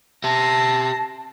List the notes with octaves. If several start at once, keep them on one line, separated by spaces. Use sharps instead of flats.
G4 E5 A5 A#6 C7